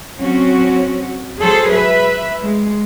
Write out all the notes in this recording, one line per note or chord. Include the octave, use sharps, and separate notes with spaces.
F#3 C4 C#4 F#4
F#3 G#4 A4 C5
B4 E5
G#3